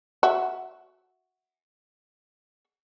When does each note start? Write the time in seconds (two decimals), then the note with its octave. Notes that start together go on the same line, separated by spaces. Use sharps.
0.23 F#4 E5